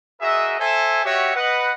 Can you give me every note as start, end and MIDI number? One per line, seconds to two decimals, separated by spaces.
0.22 0.57 66
0.22 0.57 68
0.22 0.57 70
0.22 0.57 75
0.22 0.57 76
0.60 1.03 69
0.60 1.03 72
0.60 1.03 76
0.60 1.03 80
1.05 1.33 66
1.05 1.33 67
1.05 1.33 73
1.05 1.33 75
1.05 1.33 76
1.05 1.33 78
1.36 1.74 71
1.36 1.74 75
1.36 1.74 78